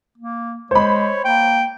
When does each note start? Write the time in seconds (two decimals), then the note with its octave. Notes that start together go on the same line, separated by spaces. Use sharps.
0.18 A#3
0.71 G#3 C5 C#5 B5
1.24 A#3 G5